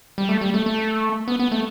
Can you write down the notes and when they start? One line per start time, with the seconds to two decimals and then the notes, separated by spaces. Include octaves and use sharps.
0.18 G3
0.29 A3
0.41 G3
0.54 A3
0.66 A3
1.28 B3
1.40 B3
1.52 A3